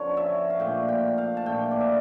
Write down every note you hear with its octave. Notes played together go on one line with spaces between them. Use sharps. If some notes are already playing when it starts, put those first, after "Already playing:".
Already playing: D3 F3 C#4 A#4 C#5
E5
F5
A#2 A3 D4 G5
G5
F5
A5
A#2 A3 D4 G5
D5
E5